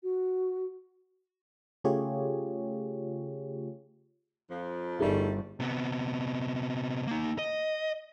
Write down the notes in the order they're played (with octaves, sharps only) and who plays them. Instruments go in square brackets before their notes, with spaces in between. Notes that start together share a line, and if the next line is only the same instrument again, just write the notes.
[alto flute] F#4
[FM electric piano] C#3 A3 F4 G4 G#4 C#5
[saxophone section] F2 F3
[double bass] G1 [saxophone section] G3 A3 [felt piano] D#4 G#4 A#4
[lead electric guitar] C3 B3
A#3 D#4
D#5